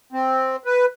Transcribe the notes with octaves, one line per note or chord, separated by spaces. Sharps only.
C4
B4